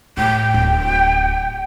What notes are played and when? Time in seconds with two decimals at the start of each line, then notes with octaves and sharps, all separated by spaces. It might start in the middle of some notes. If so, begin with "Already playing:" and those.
0.17 A2 G5
0.54 D1